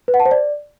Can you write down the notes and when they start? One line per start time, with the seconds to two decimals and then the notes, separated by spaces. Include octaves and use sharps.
0.08 B4
0.14 F#5
0.20 A5
0.25 C5
0.31 D5